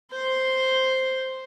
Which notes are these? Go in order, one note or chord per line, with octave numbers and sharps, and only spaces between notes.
C5 C6